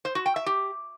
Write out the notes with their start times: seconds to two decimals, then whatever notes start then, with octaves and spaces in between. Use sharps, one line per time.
0.05 C5
0.15 F#4
0.26 G5
0.36 E5
0.46 G4